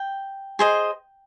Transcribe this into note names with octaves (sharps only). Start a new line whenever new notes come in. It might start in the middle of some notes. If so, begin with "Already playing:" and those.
Already playing: G5
G#4 C5 D#5